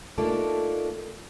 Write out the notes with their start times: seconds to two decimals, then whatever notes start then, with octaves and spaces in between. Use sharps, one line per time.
0.18 A3 A#3 D4 D#4 F4 A4